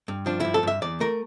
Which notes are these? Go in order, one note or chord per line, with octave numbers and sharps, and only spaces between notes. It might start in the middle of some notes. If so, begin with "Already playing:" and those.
G2
F3 D4
G2 E4
A4
G2 E5
E2 D5
A3 A#4